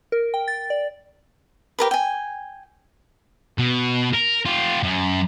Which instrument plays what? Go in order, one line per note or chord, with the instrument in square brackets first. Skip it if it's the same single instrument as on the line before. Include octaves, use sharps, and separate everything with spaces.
[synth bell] A#4
G5
A6
D5
[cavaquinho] G4 A#4 B4
G5 G#5
[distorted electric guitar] B2
A#4
F4 G4
F#2